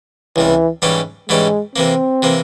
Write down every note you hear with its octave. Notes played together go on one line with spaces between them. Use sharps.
C#2 C3 E3 G3
G#2 E3 G3 C#4 G4
G#2 E3 G3 G#3 C#4 G4
C3 E3 A#3 C4
C3 E3 A#3